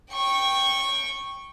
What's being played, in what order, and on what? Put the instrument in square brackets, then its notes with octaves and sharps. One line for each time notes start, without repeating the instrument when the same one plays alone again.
[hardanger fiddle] G5 C#6